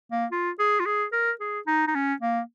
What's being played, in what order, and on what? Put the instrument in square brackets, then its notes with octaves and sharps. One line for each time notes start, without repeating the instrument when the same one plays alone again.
[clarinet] A#3
F4
G#4
F4
G#4
A#4
G#4
D#4
D#4
C#4
A#3